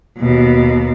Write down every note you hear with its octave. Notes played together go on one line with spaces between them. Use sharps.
D#2 B2